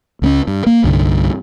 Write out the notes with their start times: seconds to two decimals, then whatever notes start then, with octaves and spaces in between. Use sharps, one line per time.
0.22 C#2 A3 C#4
0.47 G2
0.66 A#3
0.84 C2 G2 D3